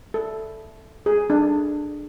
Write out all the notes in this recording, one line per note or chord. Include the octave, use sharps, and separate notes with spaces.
A4
G#4
D4